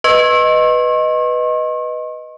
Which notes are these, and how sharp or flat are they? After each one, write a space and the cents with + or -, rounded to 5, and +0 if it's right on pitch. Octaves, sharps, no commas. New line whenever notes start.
B4 +0 D#5 +0 C#6 -45